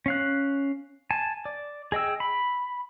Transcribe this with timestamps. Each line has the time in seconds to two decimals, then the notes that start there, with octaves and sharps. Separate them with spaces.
0.06 C#4 F5 F#6
1.11 G#5 A5
1.45 D5
1.92 G#4 D#5 G5 E6
2.20 B5